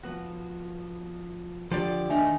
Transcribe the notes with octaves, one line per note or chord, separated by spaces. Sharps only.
F3 B3 F#4
D3 F3 G4 D5
D#3 A3 D4 D#4 E5 G#5